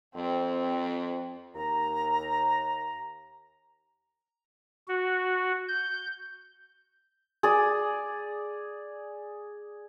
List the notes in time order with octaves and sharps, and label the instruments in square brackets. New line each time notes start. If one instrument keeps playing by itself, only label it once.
[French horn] F2 [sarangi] C4
[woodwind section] D#2 A#5
[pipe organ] F#4
G6
[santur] G#4 D5